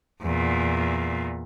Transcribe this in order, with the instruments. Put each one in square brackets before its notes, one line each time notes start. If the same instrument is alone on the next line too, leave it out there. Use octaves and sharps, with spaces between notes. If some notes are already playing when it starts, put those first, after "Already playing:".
[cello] E2 A#2